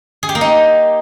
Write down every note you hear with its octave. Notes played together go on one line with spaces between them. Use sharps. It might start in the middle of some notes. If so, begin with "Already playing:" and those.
G#4
G4
A#3
D#4